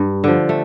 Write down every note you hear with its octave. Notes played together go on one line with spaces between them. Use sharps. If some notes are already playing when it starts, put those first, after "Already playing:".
Already playing: G2
D3 F3
A3